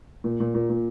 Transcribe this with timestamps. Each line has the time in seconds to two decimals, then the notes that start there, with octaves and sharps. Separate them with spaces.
0.24 A#2
0.40 A#2
0.55 A#2
0.70 A#2